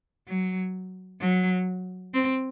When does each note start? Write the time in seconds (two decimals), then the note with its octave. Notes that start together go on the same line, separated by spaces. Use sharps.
0.27 F#3
1.21 F#3
2.14 C4